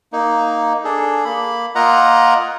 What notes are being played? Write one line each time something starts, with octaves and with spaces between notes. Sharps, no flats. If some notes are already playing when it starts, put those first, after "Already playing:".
A#3 D#4
D4 G#4 A4
A#3 B5
A#3 F4 A#4 D#5 F#5 A#5